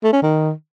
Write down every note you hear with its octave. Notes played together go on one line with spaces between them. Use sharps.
A3
C#4
D#3